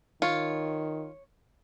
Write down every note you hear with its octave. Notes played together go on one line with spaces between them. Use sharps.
D#3 F4 C#5